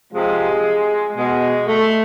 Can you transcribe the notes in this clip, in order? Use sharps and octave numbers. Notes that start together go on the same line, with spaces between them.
C3 F3 G#3
B2 G#3
A3